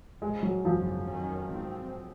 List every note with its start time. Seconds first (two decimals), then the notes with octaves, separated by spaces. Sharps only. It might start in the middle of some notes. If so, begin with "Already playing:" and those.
0.22 A#1 A#2 F3 G#3
0.43 F#3
0.65 G#1 F#2 C#3 F3
1.07 F2 D#3 F#3 C#4
1.49 G#2 F3 C4